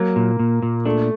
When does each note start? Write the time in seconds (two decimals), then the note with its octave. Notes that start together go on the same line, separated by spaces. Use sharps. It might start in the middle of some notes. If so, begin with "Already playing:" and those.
Already playing: F#3 A#3
0.16 A#2
0.39 A#2
0.63 A#2
0.85 A3 D4